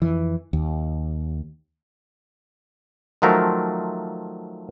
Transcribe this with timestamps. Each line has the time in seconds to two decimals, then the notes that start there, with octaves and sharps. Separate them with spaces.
0.02 F2 E3
0.53 D#2
3.22 D#3 F3 F#3 A3 A#4 C5